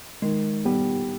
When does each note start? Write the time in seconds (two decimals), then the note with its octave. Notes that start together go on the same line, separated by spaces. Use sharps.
0.22 D#3 G#3
0.65 G3 B3